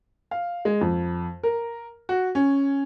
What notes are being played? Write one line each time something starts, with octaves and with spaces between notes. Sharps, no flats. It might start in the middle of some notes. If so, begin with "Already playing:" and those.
F5
G#3
F2
A#4
F#4
C#4